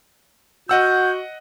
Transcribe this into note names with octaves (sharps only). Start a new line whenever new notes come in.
F#4 D#5 F#5 E6 G6